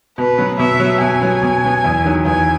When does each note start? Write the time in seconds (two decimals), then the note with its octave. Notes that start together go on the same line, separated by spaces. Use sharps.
0.17 B2 B4
0.38 F#3 B3
0.59 B2 E5
0.80 F#3 B3
1.01 B2 G#5
1.21 F#3 B3
1.43 B2
1.63 F#3 B3
1.84 E2
2.04 D#3 F#3
2.25 E2 G#5